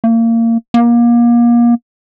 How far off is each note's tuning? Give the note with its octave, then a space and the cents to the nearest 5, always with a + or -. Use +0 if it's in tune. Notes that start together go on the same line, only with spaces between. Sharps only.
A#3 -25
A#3 +30